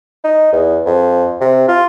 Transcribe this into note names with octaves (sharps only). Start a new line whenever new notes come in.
D#4
E2
F2
C3
F4